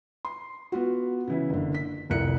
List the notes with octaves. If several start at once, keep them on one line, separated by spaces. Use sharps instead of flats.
C6
B3 F4 F#4
C#3 E3 E4
F#1 D3
B6
F1 C2 E4 F#6 C#7